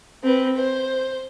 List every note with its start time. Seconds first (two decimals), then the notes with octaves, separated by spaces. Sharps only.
0.24 C4 B4
0.57 C5